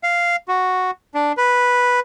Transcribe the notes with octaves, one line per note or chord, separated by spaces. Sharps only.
F5
F#4
D4
B4